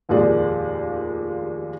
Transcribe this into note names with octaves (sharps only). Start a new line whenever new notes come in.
F1 D#2 A#2 G#3 D5